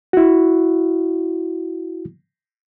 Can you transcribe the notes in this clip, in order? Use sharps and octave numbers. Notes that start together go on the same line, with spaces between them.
E4 F#4